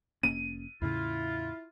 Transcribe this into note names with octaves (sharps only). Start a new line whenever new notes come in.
F1 A#3 C#4 D#7
E2 A2 C#3 E4 F4